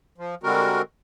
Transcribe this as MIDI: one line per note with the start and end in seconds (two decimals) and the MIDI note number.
0.18 0.35 53
0.43 0.82 50
0.43 0.82 55
0.43 0.82 56
0.43 0.82 60
0.43 0.82 66
0.43 0.82 70